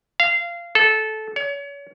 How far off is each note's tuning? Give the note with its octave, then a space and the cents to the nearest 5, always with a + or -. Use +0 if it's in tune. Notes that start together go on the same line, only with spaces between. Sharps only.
F5 -20
A4 -15
C#5 +35